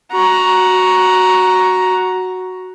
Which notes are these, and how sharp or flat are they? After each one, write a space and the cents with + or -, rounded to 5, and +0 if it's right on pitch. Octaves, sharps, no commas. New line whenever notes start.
F#4 +0 A#5 +10